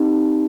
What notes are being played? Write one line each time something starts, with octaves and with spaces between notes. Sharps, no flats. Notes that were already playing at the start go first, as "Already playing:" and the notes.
Already playing: C4 D#4 G4